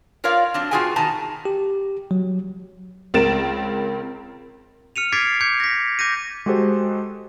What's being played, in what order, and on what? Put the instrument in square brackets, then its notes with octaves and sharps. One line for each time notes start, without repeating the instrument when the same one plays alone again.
[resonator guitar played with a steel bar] F4 A#4 C#5 D5 F5
F#3 C4 D4
B2 F4 F#4 G#4 G5 G#5
B2 D#3 A5 A#5
[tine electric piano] G4
F#3
[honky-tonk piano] C#2 C4 A#4 A6 D7 E7
[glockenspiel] F6 C#7 D#7 F7
D6 G#6 A6 B6 C7 D7
D6 G6 G#6 C#7
A#6 B6
D6 G6 A#6 D#7
[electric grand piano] G#3 F#4 G4 A4 C5